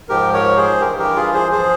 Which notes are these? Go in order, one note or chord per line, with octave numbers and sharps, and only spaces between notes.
G#2 F3 G4 A#4
A#4 C#5
G#4 C5
G2 E3 G4 A#4
G4 A#4
F4 G#4
G#4 C5
F3 G#4 C5